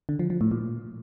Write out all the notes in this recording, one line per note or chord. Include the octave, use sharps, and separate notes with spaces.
D3
F3
F3
A2
A#2